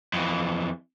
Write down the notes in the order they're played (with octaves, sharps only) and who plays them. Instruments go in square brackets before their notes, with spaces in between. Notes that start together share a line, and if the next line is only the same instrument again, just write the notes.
[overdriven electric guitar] F2 E3